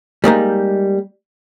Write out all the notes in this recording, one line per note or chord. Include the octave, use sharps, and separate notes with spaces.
G3 G#3 A#3 D#4